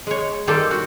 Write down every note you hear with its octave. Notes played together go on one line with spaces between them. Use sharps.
G#3 C#5
D#3 G3 F4 G4 A4
F#4